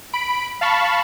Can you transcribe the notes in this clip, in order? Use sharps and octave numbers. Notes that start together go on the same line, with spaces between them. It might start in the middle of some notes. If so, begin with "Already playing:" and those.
B5 D7
F5 A5 B5 C#6